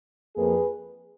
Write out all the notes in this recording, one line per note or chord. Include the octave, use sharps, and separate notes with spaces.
F2 F3 A#3 G#4 B4